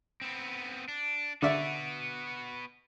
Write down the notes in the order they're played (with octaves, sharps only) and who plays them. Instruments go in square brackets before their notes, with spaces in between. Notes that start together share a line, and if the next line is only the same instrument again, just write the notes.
[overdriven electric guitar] B3 C4
D4
[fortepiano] D3 D5 E5 [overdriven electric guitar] B3 F#4